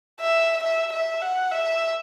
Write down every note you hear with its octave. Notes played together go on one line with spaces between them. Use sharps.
E5
E5
E5
F#5
E5